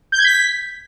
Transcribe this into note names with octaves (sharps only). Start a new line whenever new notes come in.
G6
G#6
B6